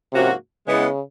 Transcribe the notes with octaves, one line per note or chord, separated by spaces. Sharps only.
G#2 C3 F3 A#3 C#4 F#4
C#3 E3 G#3 B3